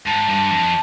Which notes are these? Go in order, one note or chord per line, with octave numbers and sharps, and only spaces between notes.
G#2 A5
G2
F2